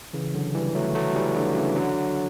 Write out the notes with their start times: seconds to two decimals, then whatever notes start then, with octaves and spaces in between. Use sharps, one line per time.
0.13 C#3 E3
0.34 D3 F#3
0.54 E3 G3
0.75 F#3 A3
0.95 F#3 A3
1.15 E3 G3
1.35 D3 F#3
1.56 C#3 E3
1.76 D3 F#3